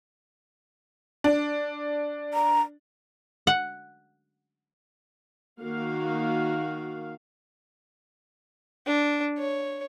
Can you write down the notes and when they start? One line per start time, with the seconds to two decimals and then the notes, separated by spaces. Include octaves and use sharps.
1.24 D4
2.34 A#5
3.47 F#5
5.60 D#3 A#3 F#4 F5
8.87 D4
9.38 C#5